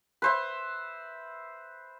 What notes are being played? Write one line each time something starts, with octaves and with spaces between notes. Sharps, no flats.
B4 C5 E5